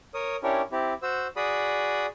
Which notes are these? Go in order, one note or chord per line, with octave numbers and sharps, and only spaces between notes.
A#4 C#5 D#6
C#4 D4 E4 G4 A#4 C#5
C4 E4 G4
F#4 C5 E6
F#4 G#4 D5 B5 D#6